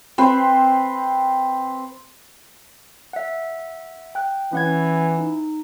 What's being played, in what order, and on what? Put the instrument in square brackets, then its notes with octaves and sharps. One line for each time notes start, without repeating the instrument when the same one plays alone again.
[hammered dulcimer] C4 B4 C5
[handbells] E5 F#5
G5 F#6
[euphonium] E3 [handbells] C#4 F#5 G#6
[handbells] D#4